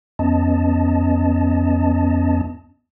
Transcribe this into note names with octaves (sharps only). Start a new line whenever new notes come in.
F2 B3 C#4 D#5 A5